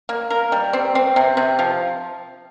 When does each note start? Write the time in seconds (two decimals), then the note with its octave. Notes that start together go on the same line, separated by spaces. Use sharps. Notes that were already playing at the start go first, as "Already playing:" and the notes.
0.09 A#3
0.30 A#4
0.52 G3
0.73 C4
0.95 C4
1.16 C3
1.37 C3
1.59 F3